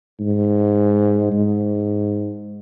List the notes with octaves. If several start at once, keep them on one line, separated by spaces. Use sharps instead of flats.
G#2
G#2